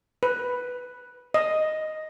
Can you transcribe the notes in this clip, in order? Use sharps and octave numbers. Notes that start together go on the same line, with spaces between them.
B4
D#5